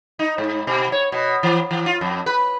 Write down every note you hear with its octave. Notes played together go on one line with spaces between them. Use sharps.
D#4
G#2
B2
C#5
B2
E3
E3
F4
F2
B4